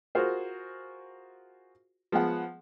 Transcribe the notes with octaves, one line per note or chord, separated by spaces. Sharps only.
F4 F#4 G#4 A#4 C5
F3 G#3 B3 F#5